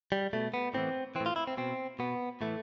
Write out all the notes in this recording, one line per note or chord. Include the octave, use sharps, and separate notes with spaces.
G3
B2 A3
B3
A2 E3 C4
E3 C4
A2
F4
E4
C4
B2 C4
B2 B3
A2 E3 A3